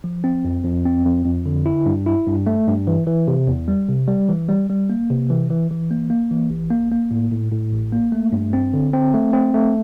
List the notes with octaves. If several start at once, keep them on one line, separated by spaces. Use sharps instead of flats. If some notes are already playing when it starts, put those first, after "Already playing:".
F3
C4
F2
F2
C4
F2
F2
D3
E4
G2
E4
G2
A3
G2
E3
E3
C3
E2
G3
C3
G3
E3
G3
G3
A#3
C3
E3
E3
E3
A#3
A#3
E3
A1
A#3
A#3
A2
A2
A2
A1
A#3
A3
G2
C4
D3
C4
A3
C4
A3